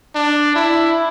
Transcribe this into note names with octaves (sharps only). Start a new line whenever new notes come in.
D4
E4